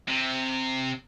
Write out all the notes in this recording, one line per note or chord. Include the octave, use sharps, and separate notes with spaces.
C3